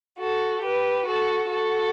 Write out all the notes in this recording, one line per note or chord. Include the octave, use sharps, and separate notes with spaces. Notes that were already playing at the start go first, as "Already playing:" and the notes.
F#4 A4
G4 B4
F#4 A4
F#4 A4